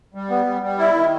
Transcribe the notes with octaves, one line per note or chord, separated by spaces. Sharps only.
G3
B3
G3
G3
E4
D#3